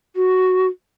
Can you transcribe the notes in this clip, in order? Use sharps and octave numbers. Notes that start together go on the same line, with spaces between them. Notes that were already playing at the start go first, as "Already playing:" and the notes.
F#4